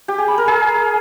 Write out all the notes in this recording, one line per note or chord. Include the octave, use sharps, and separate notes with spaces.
G4
G#4
B5
A#4
G#4